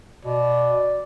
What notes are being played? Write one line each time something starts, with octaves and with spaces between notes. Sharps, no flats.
B2 D5